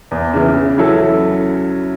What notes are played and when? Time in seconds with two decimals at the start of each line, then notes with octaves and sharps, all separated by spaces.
0.11 E2
0.33 C#3 E3
0.55 C#3
0.78 F#3 C#4 E4 A4